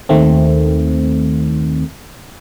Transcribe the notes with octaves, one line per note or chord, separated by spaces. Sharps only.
D#2 D#3 A3 C4